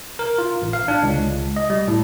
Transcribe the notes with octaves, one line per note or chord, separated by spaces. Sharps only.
A#4
F4
A1
F5
D4
C#2
C#2
D#5
G3
A2